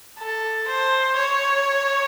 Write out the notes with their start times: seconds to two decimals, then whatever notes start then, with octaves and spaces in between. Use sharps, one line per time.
0.19 A4
0.68 C5
1.17 C#5